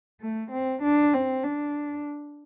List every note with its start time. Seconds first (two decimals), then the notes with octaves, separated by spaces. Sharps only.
0.21 A3
0.52 C4
0.83 D4
1.14 C4
1.44 D4